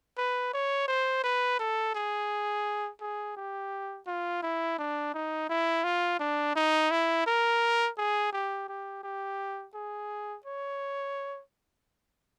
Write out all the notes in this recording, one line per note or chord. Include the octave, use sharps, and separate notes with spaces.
B4
C#5
C5
B4
A4
G#4
G#4
G4
F4
E4
D4
D#4
E4
F4
D4
D#4
E4
A#4
G#4
G4
G4
G4
G#4
C#5